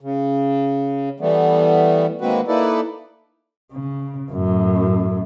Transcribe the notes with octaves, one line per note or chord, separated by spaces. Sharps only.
C#3
E3 G3 A3 B3
D#3 G#3 A#3 C4 F#4 B4
A#3 D#4 E4 A4 B4 D5
C#3
F#2 A2